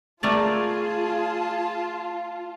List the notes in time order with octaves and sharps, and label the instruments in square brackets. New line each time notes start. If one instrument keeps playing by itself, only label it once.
[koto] A3 A#4 D5 [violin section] F4 [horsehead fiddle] G#4 [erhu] A5